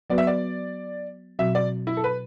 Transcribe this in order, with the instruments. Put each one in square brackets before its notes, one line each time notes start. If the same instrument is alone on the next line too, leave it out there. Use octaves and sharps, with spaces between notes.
[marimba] F#3 B3 F#4 B4 [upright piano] D5
[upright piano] E5
D5
[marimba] B2 F#3 C4 F#4 [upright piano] E5
[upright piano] D5
E4
A4
B4